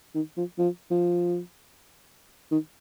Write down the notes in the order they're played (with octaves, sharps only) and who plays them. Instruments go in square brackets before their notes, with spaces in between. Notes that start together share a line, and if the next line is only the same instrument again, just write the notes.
[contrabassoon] D#3
F3
F3
F3
D#3